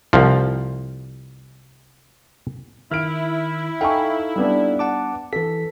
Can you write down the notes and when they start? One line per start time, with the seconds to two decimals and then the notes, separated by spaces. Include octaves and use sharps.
0.13 C2 F3
2.91 D#3 E4 F6 D7
3.81 D#4 A4 F5 G5 G#5 C#6
4.36 G3 B3 D4
4.79 F#5 A5 D6
5.33 E3 A4 B6